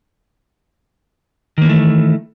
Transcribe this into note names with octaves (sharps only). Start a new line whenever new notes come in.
D#3 E3 A3 A#3